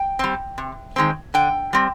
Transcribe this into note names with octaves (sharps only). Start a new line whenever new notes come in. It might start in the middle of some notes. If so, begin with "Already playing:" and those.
Already playing: G5
G3 C4
C3
D#3 G#3 C4
D3 G5
G3 C4